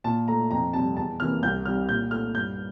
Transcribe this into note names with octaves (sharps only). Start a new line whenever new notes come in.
A#2 A5
A3 A#5
F2 A#5
C3 G3 A5
E2 A5
C3 E3 A#3 F6
C2 G6
C3 G3 F6
A#2 G6
A3 F6
G2 G6